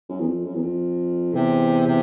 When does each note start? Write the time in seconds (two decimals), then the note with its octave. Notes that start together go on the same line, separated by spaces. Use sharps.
0.09 F#2
0.19 E2
0.27 F2
0.45 F#2
0.55 E2
0.62 F2
1.33 E2 C3
1.87 C3